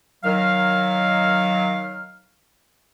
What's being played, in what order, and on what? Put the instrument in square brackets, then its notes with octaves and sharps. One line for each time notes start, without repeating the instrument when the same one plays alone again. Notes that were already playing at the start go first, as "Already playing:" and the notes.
[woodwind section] D#3 F#3 F5 F6